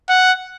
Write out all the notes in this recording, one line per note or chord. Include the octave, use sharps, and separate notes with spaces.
F#5